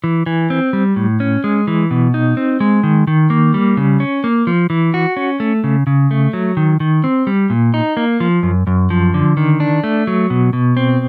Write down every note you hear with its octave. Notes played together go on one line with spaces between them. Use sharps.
E3
E3
C4
G3
A2
C#4
G#3
E3
B2
D#4
C4
G#3
D#3
D#3
A#3
G3
C#3
C#4
A#3
F3
E3
F#4
C#4
A3
C#3
C#3
A3
F#3
D#3
D#3
C4
G3
A#2
D#4
A#3
F3
F#2
F#2
F3
D3
D#3
D4
A3
F#3
B2
B2
C4